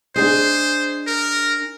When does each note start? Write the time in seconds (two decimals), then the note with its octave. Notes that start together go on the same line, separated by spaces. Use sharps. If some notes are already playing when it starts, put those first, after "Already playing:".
0.16 D4 G#4 C5 D#5
1.07 A#4